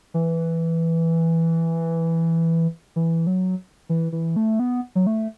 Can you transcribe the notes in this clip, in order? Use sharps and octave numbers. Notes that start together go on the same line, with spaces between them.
E3
E3
F#3
E3
E3
A3
B3
F#3
A3